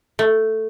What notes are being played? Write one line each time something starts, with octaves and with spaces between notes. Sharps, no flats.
A3